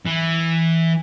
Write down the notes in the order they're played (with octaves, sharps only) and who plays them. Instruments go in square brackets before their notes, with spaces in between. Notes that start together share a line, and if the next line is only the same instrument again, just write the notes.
[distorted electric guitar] E3